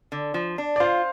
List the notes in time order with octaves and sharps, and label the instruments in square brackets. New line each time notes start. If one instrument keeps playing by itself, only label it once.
[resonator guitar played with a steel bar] D3
F3
D4
[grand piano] D5
[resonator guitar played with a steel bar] F4 [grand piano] C5 F5